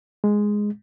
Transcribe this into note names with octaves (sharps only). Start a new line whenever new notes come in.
G#3